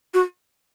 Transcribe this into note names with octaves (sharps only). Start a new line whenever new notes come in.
F#4